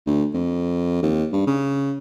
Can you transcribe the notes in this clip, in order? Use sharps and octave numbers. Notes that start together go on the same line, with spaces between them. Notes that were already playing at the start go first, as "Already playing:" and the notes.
D2
F2
D#2
G2
C#3